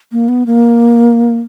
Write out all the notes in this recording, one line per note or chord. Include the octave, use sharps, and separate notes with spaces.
A#3
B3
A#3